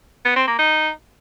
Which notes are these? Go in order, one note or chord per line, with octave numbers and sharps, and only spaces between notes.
B3
C4
A#3
D#4